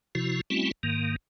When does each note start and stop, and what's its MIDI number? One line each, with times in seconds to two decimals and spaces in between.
0.15 0.41 48
0.15 0.41 53
0.15 0.41 64
0.15 0.41 66
0.50 0.71 55
0.50 0.71 57
0.50 0.71 60
0.50 0.71 61
0.50 0.71 64
0.50 0.71 66
0.83 1.16 44
0.83 1.16 51
0.83 1.16 58